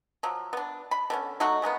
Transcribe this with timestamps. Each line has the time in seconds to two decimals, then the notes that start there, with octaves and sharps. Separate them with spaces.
0.23 F3 F#3
0.53 B3 D4
0.91 B5
1.10 D3 B3 C#4
1.40 F#3 A3 D#4 F#4
1.62 C#3 G#3 A#3 B3